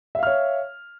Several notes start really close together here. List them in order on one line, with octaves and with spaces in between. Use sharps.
E5 F5 F6 C#5